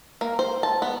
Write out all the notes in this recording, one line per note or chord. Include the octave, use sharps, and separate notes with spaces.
A#3
C5
A5
B3